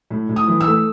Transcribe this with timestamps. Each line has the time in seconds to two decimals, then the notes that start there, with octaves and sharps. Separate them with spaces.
0.10 A2
0.29 A2
0.36 D#6
0.48 E3
0.61 E6
0.67 A3